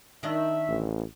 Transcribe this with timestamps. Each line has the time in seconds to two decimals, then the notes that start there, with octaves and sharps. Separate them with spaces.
0.23 D#3 D4 D#5 E5
0.68 A1